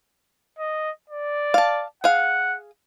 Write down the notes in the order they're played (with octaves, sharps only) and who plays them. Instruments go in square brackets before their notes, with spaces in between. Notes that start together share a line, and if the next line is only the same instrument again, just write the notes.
[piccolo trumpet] D#5
D5
[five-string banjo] F5 A5
[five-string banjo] G#4 F5 [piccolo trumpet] F#5